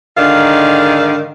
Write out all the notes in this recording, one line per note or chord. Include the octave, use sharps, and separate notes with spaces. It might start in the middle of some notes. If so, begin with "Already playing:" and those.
G#2 D3 D#3 D5 F5